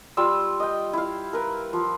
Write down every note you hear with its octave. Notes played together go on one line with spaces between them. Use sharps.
G3 F4 E6
D#5 G5
E4 F5
A#4 B4
F3